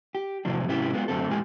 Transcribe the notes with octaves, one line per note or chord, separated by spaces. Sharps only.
G4
E2 A2 C3 F3 F#3 D4
G#2 C3 C#4 E4 G4
G#3 B3 F4
F#2 D3 A3 C4 A4
E2 A#2 G#3 G4 G#5